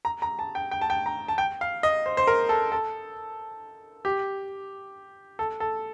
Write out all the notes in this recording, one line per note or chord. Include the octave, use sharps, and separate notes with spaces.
A#5
A#5
A5
G5
G5
A5
G5
A#5
A5
G5
F5
D#5
C5
C5
A#4
A4
A4
G4
A4
A4